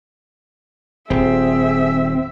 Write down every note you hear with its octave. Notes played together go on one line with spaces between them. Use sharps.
D#1 C4 G#4 E5